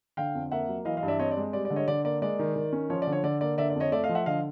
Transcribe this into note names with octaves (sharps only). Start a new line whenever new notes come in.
D3 F5 G5
F2
A#3 E5 F#5
F#3
E3 D#5 F5
D#5 F5
G2
D5 E5
C4 C#5 D#5
D5
G#3
G3 D5
D5
D3
C#5 D#5
D3 D5
A#3 D5
G#3 D5
D#3
D#3
C#4
F3 C#5
D5
D3
C#5
D3 D5
A#3 D5
D3 D5 E5
D5
F2
C#5 D#5
A3 D5 E5
D#5 F5
F3
E5 F#5
D3 D#5 F5